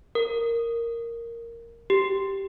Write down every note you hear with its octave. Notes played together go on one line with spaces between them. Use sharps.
A#4
G4